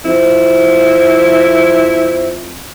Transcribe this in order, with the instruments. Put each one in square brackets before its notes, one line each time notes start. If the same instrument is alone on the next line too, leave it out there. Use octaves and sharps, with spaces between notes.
[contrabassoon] F2 [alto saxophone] E4 [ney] C5